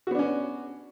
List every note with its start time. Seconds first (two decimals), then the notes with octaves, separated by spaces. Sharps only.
0.07 F#4
0.11 B3
0.15 D4
0.19 C#4